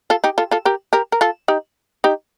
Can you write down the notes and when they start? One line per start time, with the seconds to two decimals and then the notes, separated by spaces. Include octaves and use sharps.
0.10 F4 A4
0.24 D#4 G4
0.38 F4 A4
0.51 F4 A4
0.65 G4 A#4
0.93 G4 A#4
1.12 A#4
1.21 F4 A4
1.48 D#4 G4
2.04 D#4 G4